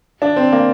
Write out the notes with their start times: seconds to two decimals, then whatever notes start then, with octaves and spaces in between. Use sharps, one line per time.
0.22 D4
0.36 C4
0.52 A#3